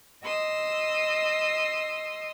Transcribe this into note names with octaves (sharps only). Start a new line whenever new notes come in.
D#5 C6 D#6 E6